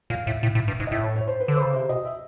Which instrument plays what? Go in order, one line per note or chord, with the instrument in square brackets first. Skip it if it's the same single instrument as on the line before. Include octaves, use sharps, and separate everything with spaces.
[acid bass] A#2 [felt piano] F5
[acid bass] A2 [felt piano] E5
[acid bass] A2
A2
G2
G#2
[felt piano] D#5
[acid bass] A2 [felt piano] E5
[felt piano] C#5
C#5
C5
B4
[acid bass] D3
[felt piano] C5
[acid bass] C#3
[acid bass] C3 [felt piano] C5
[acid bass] B2 [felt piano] D#5
[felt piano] E5